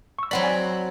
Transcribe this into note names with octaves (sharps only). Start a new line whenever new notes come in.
C#6 E6
F#3 C4 D5 F#5 B5
D5 G#5